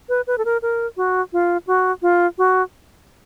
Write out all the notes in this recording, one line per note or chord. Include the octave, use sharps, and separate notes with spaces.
B4
B4
A4
A#4
A#4
F#4
F4
F#4
F4
F#4